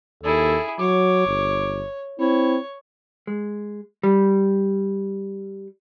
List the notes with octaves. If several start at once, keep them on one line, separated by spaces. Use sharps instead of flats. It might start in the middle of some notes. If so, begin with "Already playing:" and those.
D#2 E4 G#4 A4
F#3 C#5 D6
G1
C4 E4 C#5
G#3
G3